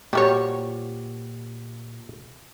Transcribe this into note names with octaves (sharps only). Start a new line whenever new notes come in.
A#2 F3 G3 F#4 G4 C#5